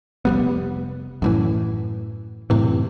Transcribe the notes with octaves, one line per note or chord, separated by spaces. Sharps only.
F1 G3 B3
F#2 A2 E3
F#2 A2 C3 E3